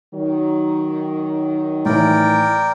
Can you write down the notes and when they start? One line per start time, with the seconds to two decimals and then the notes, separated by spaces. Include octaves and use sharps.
0.14 D#3 F#3
1.85 A2 E3 A#4 D5 G5